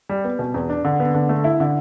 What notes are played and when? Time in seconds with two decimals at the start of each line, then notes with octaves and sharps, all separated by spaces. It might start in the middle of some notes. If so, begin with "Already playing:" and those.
0.09 G3
0.24 B3
0.39 B2
0.54 E2
0.69 D4
0.85 D3
1.00 B3
1.14 D3
1.29 A3
1.44 E4
1.60 D3